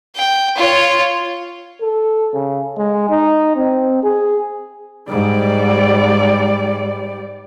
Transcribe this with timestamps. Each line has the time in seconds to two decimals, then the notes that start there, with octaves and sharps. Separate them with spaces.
0.16 G5
0.56 F4 C#5
1.81 A4
2.33 C#3
2.77 G#3
3.10 D#4
3.56 C4
4.03 G#4
5.09 G#2 G3 D5